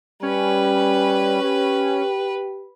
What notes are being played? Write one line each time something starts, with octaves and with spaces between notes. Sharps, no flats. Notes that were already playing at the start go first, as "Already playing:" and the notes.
G3 C#4 B4
G4